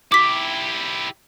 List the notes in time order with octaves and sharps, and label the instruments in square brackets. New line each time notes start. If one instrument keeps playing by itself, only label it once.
[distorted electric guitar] E4 G4 [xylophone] D6 B6